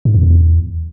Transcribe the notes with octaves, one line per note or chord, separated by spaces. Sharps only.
G#2
F2
E2